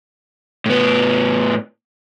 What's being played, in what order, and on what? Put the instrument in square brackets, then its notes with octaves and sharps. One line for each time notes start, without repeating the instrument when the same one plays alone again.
[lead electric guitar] A2 B3